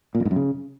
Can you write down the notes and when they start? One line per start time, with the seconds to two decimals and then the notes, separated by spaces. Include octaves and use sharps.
0.15 A#2
0.20 F2
0.25 G#2
0.31 F#2
0.36 C#3